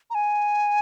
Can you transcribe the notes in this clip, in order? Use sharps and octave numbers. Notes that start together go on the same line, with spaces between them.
A#5
G#5